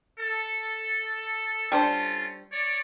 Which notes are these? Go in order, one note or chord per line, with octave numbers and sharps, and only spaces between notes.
A4
G3 C#4 D4 F4 A4 C5
C#5 D5